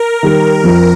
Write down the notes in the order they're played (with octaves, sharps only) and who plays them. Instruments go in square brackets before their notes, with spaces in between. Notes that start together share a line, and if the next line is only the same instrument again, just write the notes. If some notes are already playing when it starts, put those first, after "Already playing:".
Already playing: [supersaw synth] A#4
[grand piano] D#3 G3
F2